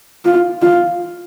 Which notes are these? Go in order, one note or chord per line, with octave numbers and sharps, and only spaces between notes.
F4
F4